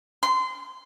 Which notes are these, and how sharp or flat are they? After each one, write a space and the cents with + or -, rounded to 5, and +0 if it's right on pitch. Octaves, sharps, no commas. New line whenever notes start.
C6 -25